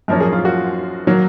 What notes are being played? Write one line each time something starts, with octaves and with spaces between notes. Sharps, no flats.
F#2 F3 A#3 C#4 A#4
G#4
F4
F#4
F#3 A#3